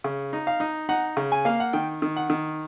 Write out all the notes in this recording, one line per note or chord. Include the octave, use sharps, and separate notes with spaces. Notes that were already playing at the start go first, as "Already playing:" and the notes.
C#3
D#4
F5
D#4
D#4 F#5
C#3
G#5
A#3 F5
F#5
D#3 G5
D#3
F#5
D#3